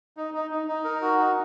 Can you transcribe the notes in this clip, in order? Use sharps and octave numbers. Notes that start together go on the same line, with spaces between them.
D#4
D#4
D#4
D#4
A#4
F#4
D#4